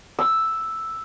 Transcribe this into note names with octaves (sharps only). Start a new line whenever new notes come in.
E6